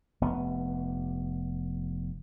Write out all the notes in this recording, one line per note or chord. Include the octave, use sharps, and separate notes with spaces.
F1 B3